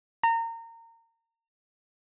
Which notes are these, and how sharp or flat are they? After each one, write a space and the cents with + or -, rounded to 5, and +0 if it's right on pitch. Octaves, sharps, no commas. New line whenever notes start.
A#5 -25